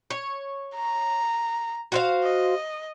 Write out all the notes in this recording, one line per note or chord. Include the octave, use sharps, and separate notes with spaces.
C#5
A#5
F#4 C5 F5
D#5